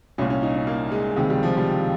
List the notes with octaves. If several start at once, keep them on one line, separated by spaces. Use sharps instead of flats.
C2 A#2 C#4
C#4
D#4
C#4
A#3
G#3
C#2 C3 D#3 G#3
G3
F3
G3